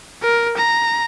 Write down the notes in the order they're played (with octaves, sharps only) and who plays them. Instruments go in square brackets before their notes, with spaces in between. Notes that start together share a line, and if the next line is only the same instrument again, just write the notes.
[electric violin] A#4
A#5